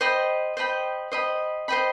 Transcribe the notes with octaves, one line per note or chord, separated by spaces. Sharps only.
C5 D#5 G5 B5
C5 D#5 G5 B5
C5 D#5 G5 B5
C5 D#5 G5 B5